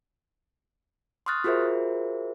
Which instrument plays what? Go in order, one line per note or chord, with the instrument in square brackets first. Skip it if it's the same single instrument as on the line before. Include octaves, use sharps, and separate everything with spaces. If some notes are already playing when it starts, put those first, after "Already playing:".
[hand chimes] C6 C#6 D#6 F6 F#6 A6
F4 F#4 G#4 A#4 C5 E5